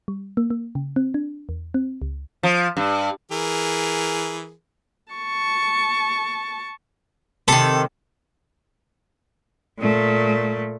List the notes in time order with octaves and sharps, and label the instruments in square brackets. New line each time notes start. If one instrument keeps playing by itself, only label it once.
[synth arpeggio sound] G3
A#3
A#3
C#3
C4
D4
E2
C4
C#2
[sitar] F3
G2
[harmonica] E3 G#4 A#4
[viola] A5 C#6
[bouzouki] C3 D#3 [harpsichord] A4
[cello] A#2 A3